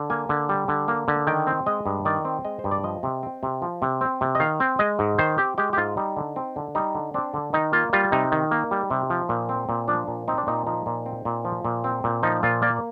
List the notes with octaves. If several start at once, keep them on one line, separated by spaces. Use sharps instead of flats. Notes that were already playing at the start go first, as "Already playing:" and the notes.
Already playing: D3
A#3 G#5
D3
G3
D3
A#3
D3
D#3 G5
C4
G#3 D#5
G2
D#3 D5
C4
G#3 D#5
C5
G2
D5
F3 D#5
C3
C4
C3
F3
C3
C4
C3
D#5
D#3 F5
C4
G#3 D#5
G#2
D#3 C5
C4 G4
G#3 G4
G4
G#2 F4
G3 D#4
D3
C4
D3
G3 D#4
D3
C4 D4
D3
D#3 D#4
A#3 F4
G3 F4
C3 D#4
D#3
A#3
G3
C3
F3
A#2
C4
A#2
F3 D4
A#2
C4 D#4
D4
A#2 D#4
F3 D#4
A#2
C4
A#2
F3
A#2
C4
A#2
F3 D#4
A#2 F4
A#3 D5